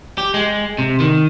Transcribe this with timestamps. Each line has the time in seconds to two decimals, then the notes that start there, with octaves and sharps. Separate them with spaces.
0.18 G4
0.34 G#3
0.78 C3
1.00 D#3